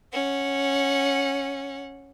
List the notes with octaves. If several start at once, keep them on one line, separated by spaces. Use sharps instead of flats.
C#4 F#5